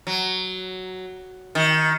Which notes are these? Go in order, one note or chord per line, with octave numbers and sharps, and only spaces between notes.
F#3
D#3